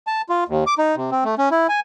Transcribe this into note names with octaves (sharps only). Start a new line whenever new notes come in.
A5
F4
D#2
D6
D#4
C3
C4
A3
C#4
E4
G#5